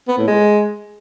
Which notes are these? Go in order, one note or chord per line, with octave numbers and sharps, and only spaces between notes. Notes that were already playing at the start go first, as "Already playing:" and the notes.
B3
A2
G#3